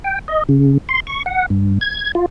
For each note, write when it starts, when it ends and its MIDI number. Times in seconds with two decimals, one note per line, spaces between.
0.04 0.19 79
0.28 0.43 75
0.49 0.78 49
0.89 1.00 84
1.07 1.23 85
1.26 1.46 78
1.50 1.79 43
1.81 2.12 92
2.15 2.26 65